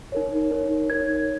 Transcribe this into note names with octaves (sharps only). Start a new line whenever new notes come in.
D#4 A#4 C#5
D#4 A#4 C#5
D#4 A#4 C#5 G#6